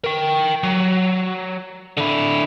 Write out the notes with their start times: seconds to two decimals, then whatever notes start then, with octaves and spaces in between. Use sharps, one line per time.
0.04 A#4 G5
0.64 F#3
1.97 D3 E4